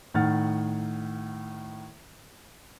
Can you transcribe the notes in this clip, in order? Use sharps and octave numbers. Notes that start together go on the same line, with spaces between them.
A2 D#3 F#5 F6 A6